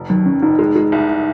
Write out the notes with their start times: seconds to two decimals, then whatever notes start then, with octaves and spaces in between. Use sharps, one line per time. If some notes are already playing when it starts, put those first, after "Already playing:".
Already playing: F1
0.09 D#2 F#3
0.26 D#3 C#4
0.42 F1 D#4
0.59 G#3
0.75 G#3
0.92 C2